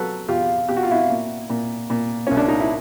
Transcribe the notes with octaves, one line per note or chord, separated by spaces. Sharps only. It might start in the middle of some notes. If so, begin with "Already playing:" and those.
Already playing: F#3 A4 B4
E2 F4 G4
B2 G4
F#4
F4
E4 F#4
A#2
A#2
A#2
C2 C#4
D4
D#4
E4